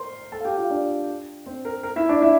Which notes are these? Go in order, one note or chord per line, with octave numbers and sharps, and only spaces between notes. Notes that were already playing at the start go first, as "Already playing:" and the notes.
Already playing: A#4 C5 C6
A4 A5
F5
G4 G5
F4 F5
D4 D5
C4 C5
A#4
A#4
E4 E5
D4 D5
E4 E5